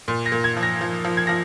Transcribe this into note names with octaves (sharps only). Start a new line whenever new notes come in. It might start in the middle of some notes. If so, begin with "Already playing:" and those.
A#2
A#6
A#2
G#6
F3
A#6
F3
F3
G#6
F3 A#6